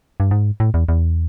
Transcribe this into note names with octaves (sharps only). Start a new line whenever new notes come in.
G2
G#2
A2
E2
E2